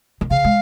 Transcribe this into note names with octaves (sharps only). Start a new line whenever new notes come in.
D#3
C#3 F5
G#3